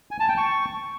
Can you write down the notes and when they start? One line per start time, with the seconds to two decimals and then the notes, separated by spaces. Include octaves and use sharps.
0.11 G#5
0.20 A5
0.29 G5
0.38 C#6